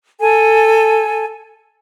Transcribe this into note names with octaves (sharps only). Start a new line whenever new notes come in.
A4 G#5